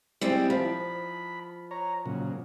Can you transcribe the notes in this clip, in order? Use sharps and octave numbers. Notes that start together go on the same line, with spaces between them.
G3 G#3 C4 E4 G4
F3 B5
C#5 A#5
A#2 C#3 F#3